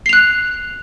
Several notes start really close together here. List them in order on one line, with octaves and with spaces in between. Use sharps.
C7 F7 F#6